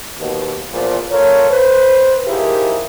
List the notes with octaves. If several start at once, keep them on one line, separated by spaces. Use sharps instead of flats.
D#2 B2
E2 A#2 F3
F4 A4 A#4 C#5
B4 C5
F3 D#4 E4 G4 G#4 A#4